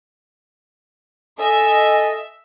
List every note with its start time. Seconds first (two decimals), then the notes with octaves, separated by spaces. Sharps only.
1.39 A4 D#5 E5 G#5